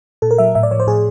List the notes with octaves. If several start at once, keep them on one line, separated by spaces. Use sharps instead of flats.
A#2 A4
A#4
F#3 E5
A2 E5
D5
F3 C#5
C5
A2 G#4